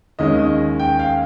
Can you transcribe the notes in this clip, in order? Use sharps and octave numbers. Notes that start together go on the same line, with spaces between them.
D#2 D#3 G#3 C#4 D#5
D#5
G5
F5